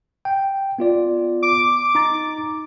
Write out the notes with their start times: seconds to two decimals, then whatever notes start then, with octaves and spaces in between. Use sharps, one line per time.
0.25 G5
0.79 B3 F4 D5
1.42 D6
1.95 D#4 A#5 A6